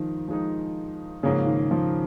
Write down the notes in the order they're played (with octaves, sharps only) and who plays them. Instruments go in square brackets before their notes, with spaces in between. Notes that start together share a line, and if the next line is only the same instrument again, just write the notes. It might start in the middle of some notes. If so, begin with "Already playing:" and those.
Already playing: [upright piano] D#3 F3 [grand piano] G#3 D#4
[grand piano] F3 G#3 D#4
[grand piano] G#2 F3 A#3 C#4 G#4 [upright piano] C#3
[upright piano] D#3
F3